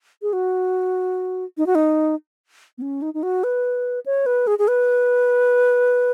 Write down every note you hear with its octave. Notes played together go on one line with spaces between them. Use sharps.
G#4
F#4
D#4
F#4
D#4
B3
C#4
D#4
D#4
F#4
B4
C#5
B4
G#4
G#4
B4